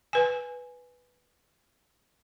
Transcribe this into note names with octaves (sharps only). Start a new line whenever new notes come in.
B4 G#5